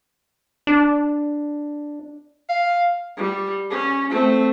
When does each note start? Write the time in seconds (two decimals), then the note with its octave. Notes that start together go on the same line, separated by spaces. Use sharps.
0.67 D4
2.49 F5
3.17 G3
3.71 C#4
4.10 A3 C4